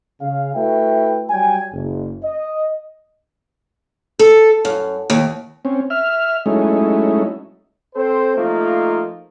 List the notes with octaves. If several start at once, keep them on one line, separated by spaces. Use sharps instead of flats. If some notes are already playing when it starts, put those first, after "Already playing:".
C#3 F5
A3 E4 F#4 B4 E5 G5
F#3 G3 G5 G#5
F#1
D#5
A4
F#2
D#2
C4 C#4
E5 F6
F#3 G#3 A3 C#4 D#4 E4
C4 A4 C5
F3 A3 A#3 D#4 F4